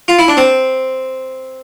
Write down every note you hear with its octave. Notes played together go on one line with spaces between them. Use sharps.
F4
E4
D4
C4